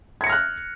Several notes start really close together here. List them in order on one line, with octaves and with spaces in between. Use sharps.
G#6 C#7 A#6 F6 F#6